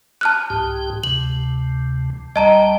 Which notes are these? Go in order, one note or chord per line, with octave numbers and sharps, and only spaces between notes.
A5 F6 F#6
C2 G#2 G4
D2 C3 F#7
C#2 G3 D#5 G5 A5 A#5